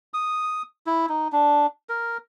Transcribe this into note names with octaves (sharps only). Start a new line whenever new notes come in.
D#6
E4
D#4
D4
A#4